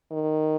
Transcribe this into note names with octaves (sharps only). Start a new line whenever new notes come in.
D#3